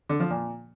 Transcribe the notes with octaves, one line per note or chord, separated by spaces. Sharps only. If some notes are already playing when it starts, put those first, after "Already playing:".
D3
F3
A#2